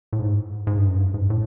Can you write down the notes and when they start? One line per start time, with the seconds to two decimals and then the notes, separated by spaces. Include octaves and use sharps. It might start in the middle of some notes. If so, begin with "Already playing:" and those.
0.13 A2
0.19 G#2
0.67 G#2
0.78 G2
0.89 F#2
1.00 G2
1.14 G#2
1.30 A2